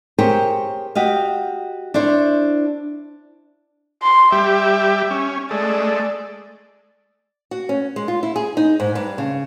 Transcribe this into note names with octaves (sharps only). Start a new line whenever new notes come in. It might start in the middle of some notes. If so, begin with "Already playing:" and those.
G4 G#4 A#4 C5 C#5
F#4 G4 D#5 F5
D4 E4 C5 C#5
C6
G3 G4 E5
C#4
G#3 A3 D5
F#4
C#4
G#3
F4
E4
G#4
D#4
G#2
G2
C#3